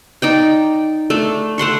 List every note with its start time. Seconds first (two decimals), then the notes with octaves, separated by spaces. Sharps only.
0.22 D#4 D5 G5
1.10 A3 D4
1.58 A3 F#5 C6 C#6